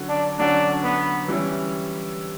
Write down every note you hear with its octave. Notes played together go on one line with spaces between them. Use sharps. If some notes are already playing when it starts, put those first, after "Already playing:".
Already playing: D3 F#3 C#4 F#4
D4
D3 F#3 C#4 D4 F#4
B3
E3 G3 C#4 E4